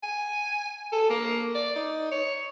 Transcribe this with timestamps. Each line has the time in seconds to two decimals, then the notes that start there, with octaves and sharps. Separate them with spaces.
0.03 G#5
0.92 A4
1.10 A#3
1.55 D5
1.76 D#4
2.11 C#5